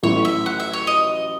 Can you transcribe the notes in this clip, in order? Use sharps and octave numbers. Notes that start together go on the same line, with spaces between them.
A1 A2 F#3 A3 E4 C#5
E5
F#5
E5
C#5
D#5